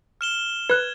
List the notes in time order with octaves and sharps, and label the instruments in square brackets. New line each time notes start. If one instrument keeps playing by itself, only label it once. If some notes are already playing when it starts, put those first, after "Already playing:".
[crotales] F6 E7 G7
[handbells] B4 F#6 [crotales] G#6